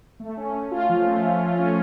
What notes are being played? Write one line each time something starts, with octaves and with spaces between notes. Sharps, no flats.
A3
C#4
C#4
F4
F3
A3
C#4
F4
C#4